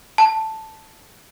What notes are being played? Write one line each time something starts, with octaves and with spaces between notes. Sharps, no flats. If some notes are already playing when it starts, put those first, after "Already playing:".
A5